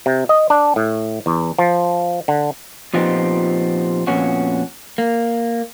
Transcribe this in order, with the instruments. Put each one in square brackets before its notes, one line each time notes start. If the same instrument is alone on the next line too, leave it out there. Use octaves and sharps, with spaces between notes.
[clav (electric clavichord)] C3
D#5
D4
A2
E2
F3
D3
[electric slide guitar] A#2 F3 B3 C4 D#4 G4
F2 A#2 B3 C#4 F#4
A#3